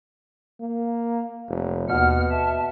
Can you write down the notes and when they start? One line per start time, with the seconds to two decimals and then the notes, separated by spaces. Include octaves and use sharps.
0.61 A#3
1.48 F1
1.89 D#2 B2 F#5 F6
2.31 E5 A5